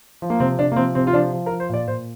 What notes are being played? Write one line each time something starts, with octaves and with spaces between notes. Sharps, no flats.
F3
A#3
C3 C4
C3 D4
A#3
F3 C4
C3 C4
F4
F3 D4
F3
A#4
F3
C5
A#2 D5
A#2 C5